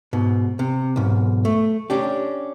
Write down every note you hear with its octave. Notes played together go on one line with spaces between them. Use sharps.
G#2 B2
C3
B1 G#2
A3
C#4 D4 G4